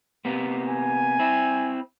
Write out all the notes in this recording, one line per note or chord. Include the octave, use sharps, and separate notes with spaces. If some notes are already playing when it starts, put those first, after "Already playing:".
C3 A#3 B3
G#5
C4 E4